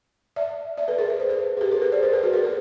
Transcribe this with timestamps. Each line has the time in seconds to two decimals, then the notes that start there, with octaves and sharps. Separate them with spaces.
0.36 D5 E5
0.77 D5 E5
0.88 A4 B4
0.98 G#4 A#4
1.10 B4
1.20 C5
1.29 A4 B4
1.57 G#4
1.61 G4 A4
1.71 G#4 A#4
1.82 A4 B4
1.92 C5 D5
2.03 A#4 C5
2.13 A4 B4
2.23 F#4 G#4
2.33 G#4 A#4
2.44 A4 B4